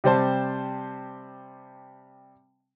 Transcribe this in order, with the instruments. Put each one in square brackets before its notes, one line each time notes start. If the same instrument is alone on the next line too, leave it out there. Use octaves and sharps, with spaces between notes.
[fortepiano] C3 G3 C5 A5